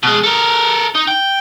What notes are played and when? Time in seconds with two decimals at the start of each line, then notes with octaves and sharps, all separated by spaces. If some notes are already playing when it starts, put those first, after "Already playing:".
0.03 B2 G#3
0.23 A4 A#4
0.95 D#4
1.08 G5